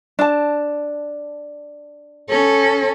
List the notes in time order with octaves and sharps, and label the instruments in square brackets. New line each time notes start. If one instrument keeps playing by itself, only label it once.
[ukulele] D4 A5
[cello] C#4 A4